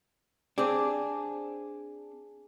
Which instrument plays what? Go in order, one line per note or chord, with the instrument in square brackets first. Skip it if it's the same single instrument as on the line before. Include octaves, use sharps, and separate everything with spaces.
[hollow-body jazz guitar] C4 D4 [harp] G#4 D6